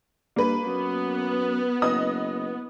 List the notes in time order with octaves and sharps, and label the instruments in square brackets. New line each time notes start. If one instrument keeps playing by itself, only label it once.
[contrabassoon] G2 [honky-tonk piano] A#3 B4
[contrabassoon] F#2 [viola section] B3
[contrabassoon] F#1 [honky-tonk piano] D#5 D#6